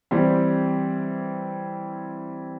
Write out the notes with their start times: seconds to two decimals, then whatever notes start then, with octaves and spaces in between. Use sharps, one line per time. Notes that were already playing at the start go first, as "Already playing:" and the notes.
0.11 E3 G3 C4 G4